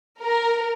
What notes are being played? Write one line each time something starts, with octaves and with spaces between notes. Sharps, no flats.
A#4